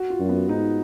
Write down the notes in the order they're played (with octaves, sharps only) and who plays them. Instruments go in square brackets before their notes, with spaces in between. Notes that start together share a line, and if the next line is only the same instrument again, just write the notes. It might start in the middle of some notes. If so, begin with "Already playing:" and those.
Already playing: [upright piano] F#4
F4
[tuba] F#2
[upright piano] B3
[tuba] G#2 [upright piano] D#4